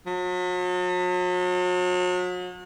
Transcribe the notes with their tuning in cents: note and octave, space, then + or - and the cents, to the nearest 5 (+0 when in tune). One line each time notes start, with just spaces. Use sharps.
F#3 -40